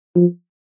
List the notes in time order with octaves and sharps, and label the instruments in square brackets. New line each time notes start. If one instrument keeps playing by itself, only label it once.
[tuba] F3